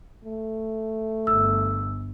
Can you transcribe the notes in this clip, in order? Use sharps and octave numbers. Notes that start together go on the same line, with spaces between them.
A3
G1 E6